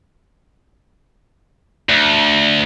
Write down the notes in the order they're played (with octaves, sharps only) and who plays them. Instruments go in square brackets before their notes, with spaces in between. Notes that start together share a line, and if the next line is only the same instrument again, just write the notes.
[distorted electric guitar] D2